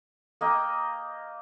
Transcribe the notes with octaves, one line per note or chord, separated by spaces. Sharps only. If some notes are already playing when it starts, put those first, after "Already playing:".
A#3 D#5 G5